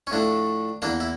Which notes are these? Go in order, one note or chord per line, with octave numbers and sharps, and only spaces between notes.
C#4
A2 F3 A3 D4
E2 E3 A#3 D4
E4